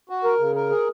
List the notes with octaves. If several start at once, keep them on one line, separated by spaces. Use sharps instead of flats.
F#4
A#4
C#3
A#4
G#4